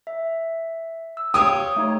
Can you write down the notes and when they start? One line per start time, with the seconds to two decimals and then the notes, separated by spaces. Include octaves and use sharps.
0.07 E5
1.17 E6
1.34 G4 C#5 F5 D#6
1.76 A3 D#4 C#5